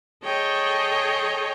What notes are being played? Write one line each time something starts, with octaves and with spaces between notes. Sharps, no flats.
G#4 A4 C#5 D#5 G5